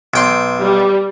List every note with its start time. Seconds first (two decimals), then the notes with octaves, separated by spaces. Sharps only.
0.14 B1 G5 C6
0.60 G3